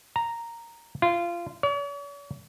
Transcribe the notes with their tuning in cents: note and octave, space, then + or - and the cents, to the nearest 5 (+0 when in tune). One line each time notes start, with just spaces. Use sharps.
A#5 -5
F4 -20
C#5 +45